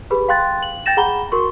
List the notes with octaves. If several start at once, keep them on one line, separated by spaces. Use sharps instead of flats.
G4 G#4 B4 B5
F5 G5 C6 F#6 A6
F#7
G5 G6 A6 A#6 E7
G#4 F#5 A#5 B5 G7
F#4 A#4 C6 C#6